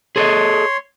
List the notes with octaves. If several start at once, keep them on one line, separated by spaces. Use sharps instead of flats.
G#4 A4 C#5 D#5 C6